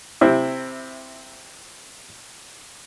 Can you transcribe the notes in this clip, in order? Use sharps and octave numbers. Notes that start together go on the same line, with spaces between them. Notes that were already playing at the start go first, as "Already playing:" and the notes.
C3 C4 E4